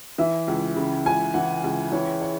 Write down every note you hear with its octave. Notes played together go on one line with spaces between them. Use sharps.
E3 E5
C#2
C#3
C#2 G#5
E3 F#5
C#2
E3 C#5
C#5